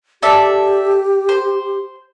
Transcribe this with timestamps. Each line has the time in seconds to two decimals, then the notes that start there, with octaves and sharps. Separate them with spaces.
0.22 G4 A4 D5 E5
1.29 C5